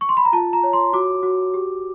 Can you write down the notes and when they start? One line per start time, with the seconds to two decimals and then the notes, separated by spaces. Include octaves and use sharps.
0.01 C#6
0.09 C6
0.17 B5
0.25 A#5
0.33 F4 A5
0.53 A#5
0.63 C#5
0.73 C6
0.93 F#4 D6
1.23 F#4
1.54 G4